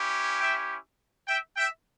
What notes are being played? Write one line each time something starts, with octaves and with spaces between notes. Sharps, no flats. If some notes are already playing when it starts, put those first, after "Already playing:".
Already playing: C#4 E4 G4
E5 G5
E5 G5
E5 G5